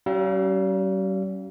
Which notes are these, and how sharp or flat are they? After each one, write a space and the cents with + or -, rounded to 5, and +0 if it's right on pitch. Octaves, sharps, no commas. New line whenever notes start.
G3 -45 C#4 +5 F5 -15